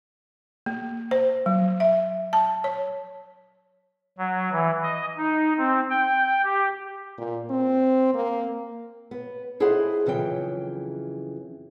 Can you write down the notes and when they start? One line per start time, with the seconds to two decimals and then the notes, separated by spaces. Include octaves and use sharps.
0.66 A#3
1.11 C5
1.46 F#3
1.80 E5
2.33 A5
2.64 C#5
4.18 F#3
4.51 E3
4.83 D#5
5.18 D#4
5.58 C4
5.90 G5
6.44 G4
7.18 A#2
7.50 C4
8.14 A#3
9.11 B3
9.60 E4 G#4 A4 C5 D#5 F#5
10.06 F2 C#3 E3 F#3 G5